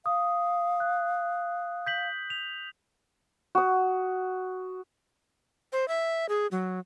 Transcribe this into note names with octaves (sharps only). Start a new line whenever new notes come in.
F5 D#6
F#6
G6 B6 F#7
F7
F#4 D#6
C5
E5
G#4
F#3